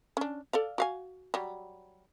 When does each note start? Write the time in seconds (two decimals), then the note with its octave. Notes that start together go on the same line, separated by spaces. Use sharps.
0.17 C#4 D4
0.53 A4 D5 F5
0.78 F#4 F5 G#5
1.34 F#3 G3